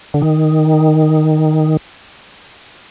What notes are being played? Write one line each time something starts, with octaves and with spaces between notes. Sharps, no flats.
D3
D#3